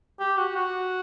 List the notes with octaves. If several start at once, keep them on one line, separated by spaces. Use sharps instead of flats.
G4
F#4
F#4